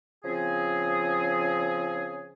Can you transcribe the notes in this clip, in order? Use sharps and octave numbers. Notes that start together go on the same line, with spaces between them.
C#3 F3 C4 G#4